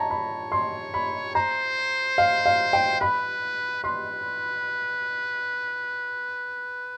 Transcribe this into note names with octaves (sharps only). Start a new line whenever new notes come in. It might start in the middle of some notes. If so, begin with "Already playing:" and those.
Already playing: C#5 A5 A#5
B5
C6
B5
C5 A#5
F5
F5
G5
B4 B5
B4 C6